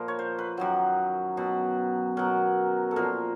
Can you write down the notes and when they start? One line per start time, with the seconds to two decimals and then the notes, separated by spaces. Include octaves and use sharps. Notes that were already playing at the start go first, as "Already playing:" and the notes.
Already playing: A#2 F3 A#4
0.08 C#5
0.19 C5
0.39 B4
0.57 F#2 D#3 F#3
1.37 B2 F#3
2.17 B2 F#3 A#4
2.91 A4
2.96 A#2 F3 A#4